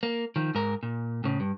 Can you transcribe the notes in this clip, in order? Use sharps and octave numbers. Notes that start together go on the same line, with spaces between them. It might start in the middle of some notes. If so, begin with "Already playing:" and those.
A#3
D#3 F3
G#2 A#4
A#2
A2 C#3
G2